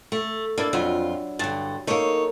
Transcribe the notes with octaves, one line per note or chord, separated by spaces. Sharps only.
A3
A#3 D4 E4 D5
F2 F#3 F4
G2 D3 A5
A3 A#3 D#4 C#5